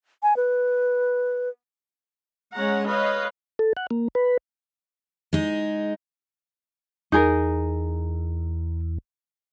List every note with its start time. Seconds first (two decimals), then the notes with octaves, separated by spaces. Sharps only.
0.23 G#5
0.37 B4
2.55 G#3 C#4 C#5 F#5 A#5
2.88 B4 C#5 D#5 F5
3.59 A4
3.77 F#5
3.91 A#3
4.15 B4
5.33 G#3 D#4
7.12 E2 D#4 G#4 A#4